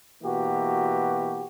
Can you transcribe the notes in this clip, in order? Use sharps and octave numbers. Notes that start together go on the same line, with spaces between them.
B2 E3 A#3 F#4 G4